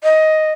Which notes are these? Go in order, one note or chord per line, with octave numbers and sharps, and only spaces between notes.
D#5